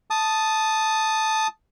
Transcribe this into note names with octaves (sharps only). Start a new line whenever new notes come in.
A5 D#6